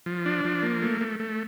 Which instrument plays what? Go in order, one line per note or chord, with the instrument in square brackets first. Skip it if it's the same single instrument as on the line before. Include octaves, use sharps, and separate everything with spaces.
[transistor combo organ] F3
D4
F3
A#3
A3
A3
A3